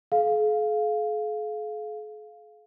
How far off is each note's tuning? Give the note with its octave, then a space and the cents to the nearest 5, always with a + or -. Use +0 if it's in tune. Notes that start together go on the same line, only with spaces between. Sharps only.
G#4 +45 F5 +0